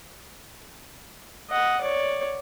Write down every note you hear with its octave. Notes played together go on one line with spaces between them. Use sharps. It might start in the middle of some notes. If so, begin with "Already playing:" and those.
D#5 F#5
C#5 D5